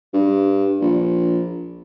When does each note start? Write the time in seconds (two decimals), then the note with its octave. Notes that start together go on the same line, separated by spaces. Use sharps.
0.14 G2
0.81 A#1